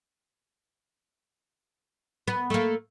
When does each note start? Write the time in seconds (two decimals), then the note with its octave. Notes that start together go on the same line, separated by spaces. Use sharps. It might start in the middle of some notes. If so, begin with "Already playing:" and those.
2.28 B3
2.50 A3 A#3